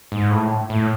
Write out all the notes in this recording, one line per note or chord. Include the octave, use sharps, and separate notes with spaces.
G#2
A2
A2